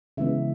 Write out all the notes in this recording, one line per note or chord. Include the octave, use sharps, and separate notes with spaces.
C#3 E3 G#3 B3 E5